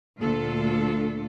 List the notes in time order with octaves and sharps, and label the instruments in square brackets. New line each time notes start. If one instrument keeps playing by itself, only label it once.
[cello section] D2 A#2 D4 F4 A4